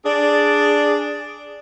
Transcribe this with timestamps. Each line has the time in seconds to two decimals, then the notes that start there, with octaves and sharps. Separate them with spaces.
0.05 D4 G#4 D5